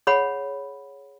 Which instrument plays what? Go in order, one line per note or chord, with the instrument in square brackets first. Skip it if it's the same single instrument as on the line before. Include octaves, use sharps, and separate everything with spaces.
[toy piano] G#4 C#5 F#5 B5